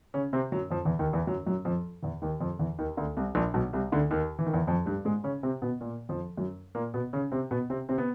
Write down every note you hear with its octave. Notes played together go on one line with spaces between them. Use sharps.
C#3 C#4
C3 C4
F#2 F#3
F2 F3
E2 E3
D#2 D#3
E2 E3
F#2 F#3
F#2 F#3
F2 F3
E2 E3
D#2 D#3
F2 F3
E2 E3
D#2 D#3
D2 D3
C2 C3
A#1 A#2
B1 B2
C2 C3
D2 D3
D#2 D#3
E3
D#3
E2 E3
F2 F3
G2 G3
G#2 G#3
C#3 C#4
C3 C4
B2 B3
A#2 A#3
F2 F3
F#2 F#3
A#2 A#3
B2 B3
C#3 C#4
C3 C4
B2 B3
C3 C4
C3 C4
B3